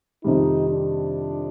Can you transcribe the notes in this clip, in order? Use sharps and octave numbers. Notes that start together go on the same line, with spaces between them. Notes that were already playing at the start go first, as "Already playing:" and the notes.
F2 C3 D#3 G3 D#4
D4